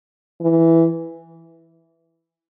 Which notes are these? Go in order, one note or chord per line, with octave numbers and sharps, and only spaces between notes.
E3